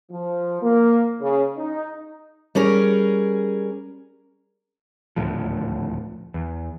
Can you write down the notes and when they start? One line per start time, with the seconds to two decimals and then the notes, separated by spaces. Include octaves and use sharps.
0.11 F3
0.62 A#3
1.21 C#3
1.56 D#4
2.55 G3 C#4 G#4 A#4
5.16 D#1 D2 A2 F3
6.34 E2